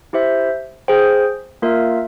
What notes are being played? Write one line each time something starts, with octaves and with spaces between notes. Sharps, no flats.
E4 G4 C5 E5
G#4 C5 G5
A#3 F4 A#4 E5